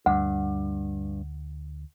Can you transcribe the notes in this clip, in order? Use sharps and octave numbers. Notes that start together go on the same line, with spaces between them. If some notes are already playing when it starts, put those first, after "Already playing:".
D2 G2 F#5